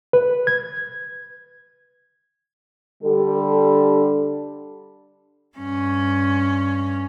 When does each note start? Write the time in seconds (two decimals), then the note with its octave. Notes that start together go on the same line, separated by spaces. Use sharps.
0.13 B4
0.47 G#6
3.04 D3 G3 D4 G4 A4
5.57 G2 C#4